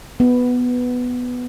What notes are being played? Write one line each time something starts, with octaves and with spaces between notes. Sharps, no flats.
B3